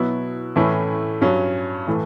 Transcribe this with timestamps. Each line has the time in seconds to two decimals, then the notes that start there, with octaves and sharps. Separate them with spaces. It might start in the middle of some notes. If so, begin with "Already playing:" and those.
Already playing: B2 F#3 B3 E4
0.56 A2 E3 A3 C#4 E4
1.21 G2 F#3 C#4
1.87 A2 E3 A3